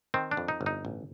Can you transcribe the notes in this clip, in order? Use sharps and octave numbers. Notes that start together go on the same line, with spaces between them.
D#3 C4
D4
F2
D#4
G1
D#4
A1